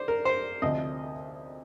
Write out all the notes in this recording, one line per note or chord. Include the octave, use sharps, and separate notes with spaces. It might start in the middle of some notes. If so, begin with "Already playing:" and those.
Already playing: C5 D5
A#4
C5
D2 C3 F3 D#5